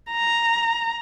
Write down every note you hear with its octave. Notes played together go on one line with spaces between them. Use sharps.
A#5